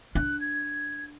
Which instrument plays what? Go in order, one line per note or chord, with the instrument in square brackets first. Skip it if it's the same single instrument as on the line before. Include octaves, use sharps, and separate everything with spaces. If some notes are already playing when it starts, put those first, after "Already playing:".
[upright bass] D4 [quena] F#6
[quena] G#6